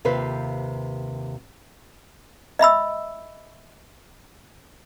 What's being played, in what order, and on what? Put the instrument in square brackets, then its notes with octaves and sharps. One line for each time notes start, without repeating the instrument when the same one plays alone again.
[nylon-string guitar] D#2 C3 F4 B4 C5
[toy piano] D#5 E5 B5 E6